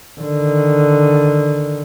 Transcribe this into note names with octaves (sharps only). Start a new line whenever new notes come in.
D3 D#3